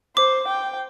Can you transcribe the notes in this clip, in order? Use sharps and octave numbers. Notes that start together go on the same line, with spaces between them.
C5 D6
G5